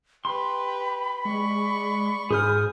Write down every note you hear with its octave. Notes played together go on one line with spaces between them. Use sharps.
G4 B4 B5 C6
G#3 D5 C#6
G#2 G#4 C5 G#5 D#6 F6